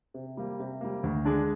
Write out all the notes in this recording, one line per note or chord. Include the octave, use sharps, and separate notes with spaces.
C3
G3 A#3
C3
G3 A#3
D2
D3 G#3 D4